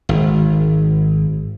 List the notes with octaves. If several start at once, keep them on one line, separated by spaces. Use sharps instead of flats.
G#1